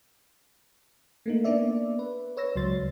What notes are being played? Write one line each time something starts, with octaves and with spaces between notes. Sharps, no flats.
A3 A#3 D#4
A#3 B3 D4 D5 E5
B4
B4 C#5 E6 A#6
C#2 F#3 C6 A6